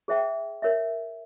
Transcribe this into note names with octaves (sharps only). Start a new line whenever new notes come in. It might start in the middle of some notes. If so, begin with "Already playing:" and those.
G#4 C5 E5 G5
A#4 C#5 E5